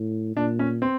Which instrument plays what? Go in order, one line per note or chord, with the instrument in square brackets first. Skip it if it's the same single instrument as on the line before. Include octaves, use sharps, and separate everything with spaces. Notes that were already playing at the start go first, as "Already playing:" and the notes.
Already playing: [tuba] A2
[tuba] A#2 [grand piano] D4
[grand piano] C#4
C4